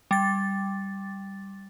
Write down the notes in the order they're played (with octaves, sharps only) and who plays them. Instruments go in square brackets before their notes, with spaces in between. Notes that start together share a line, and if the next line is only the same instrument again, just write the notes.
[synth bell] G3 A6